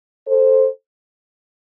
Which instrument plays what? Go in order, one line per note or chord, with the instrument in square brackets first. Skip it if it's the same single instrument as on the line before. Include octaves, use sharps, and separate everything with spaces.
[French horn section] A4 C5